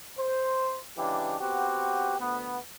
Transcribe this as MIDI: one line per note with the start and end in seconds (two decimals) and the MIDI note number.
0.17 0.75 72
0.97 1.36 49
0.97 1.36 52
0.97 1.36 56
0.97 1.36 62
0.97 1.36 67
1.40 2.18 59
1.40 2.18 60
1.40 2.18 66
1.40 2.18 67
2.19 2.56 38
2.19 2.56 59